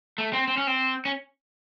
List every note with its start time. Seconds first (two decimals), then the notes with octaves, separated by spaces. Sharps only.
0.18 A3
0.33 C4
0.48 C4
0.57 C#4
0.67 C4
1.05 C#4